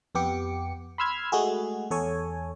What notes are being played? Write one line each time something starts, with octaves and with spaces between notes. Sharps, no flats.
F2 B3 G4 D6 C#7
B5 C6 E6 F6 G#6
G#3 A3 F#4 G#4
E2 A4 C#5 G#5